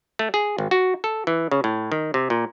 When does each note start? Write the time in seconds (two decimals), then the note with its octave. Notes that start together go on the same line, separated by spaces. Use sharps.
0.19 A3
0.34 G#4
0.58 G#1
0.71 F#4
1.04 A4
1.27 E3
1.51 C#3
1.64 A2
1.92 D#3
2.14 C3
2.30 A#2